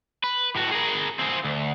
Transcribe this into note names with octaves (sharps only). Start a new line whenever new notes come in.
B4
A2 F#4
G#4 A#4
C4 G#4
D2